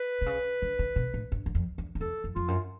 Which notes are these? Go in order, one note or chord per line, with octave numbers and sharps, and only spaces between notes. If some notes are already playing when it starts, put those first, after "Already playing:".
Already playing: B4
C3
C#3
D3
C#3
B2
A2
G2
F#2
F2
E2
F2
E2 A4
F2
F2 F4
F#2